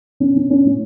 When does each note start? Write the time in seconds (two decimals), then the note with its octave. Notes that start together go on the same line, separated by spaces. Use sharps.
0.20 C#4
0.36 C#4
0.50 C#4
0.65 A2